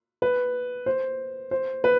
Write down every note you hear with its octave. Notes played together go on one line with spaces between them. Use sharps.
B4
C5
C5
B4